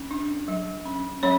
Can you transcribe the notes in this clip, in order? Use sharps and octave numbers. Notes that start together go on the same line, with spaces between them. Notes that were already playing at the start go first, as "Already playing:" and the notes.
Already playing: C#4
D4
F#3
C#4
F#3 C#4 C#5